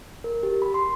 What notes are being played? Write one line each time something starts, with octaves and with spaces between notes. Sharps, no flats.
A#4
G4
B5
C6